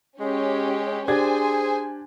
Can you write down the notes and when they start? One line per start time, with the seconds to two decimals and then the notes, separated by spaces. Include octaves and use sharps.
0.20 G#3 C#4 G4
1.08 D4 G4 G#4 C5 G#5 G#6